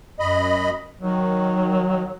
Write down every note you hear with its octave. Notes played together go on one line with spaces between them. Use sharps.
F#2 D#5 B5
D#3 F#3